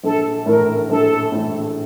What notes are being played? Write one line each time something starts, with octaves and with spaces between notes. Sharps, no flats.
A#1 A4
A2 E3 A3 A#4
A#1 A4
A2 E3 A3